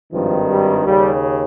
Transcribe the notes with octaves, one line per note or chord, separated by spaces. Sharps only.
G#1 G2 D#3 F3
G3
D#2 C#3 G3